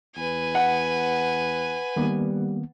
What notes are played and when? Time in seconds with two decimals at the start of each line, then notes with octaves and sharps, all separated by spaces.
0.16 E2 B4 G#5
0.55 F#5
1.96 D#3 G3 A#3 B3